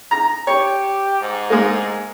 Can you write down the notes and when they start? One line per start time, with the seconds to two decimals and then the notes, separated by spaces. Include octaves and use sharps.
0.11 A#5
0.47 G4 C#5
1.21 G#2
1.50 G#3 A#3